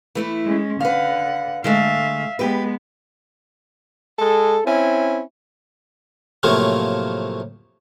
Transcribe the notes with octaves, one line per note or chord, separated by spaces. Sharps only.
E3 A3 E4
G#3 C#4
D3 B4 F5 F#5
D3 G#3 A3 E5 F5
G#3 B3 G4 B4
G#3 A4
C4 C#4 E4
A2 C3 F3 F#3 A3 A#3